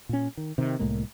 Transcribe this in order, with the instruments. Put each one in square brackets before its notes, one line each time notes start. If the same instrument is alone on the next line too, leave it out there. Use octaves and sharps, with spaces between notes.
[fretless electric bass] A#2 C#4
D#3
C3 D#3
C2 A2 G#3 A#3